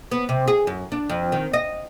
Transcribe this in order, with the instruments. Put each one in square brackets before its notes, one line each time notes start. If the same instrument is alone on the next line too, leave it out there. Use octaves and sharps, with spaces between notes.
[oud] B3
C3
G#4
F#2
D4
F2
D#3
D#5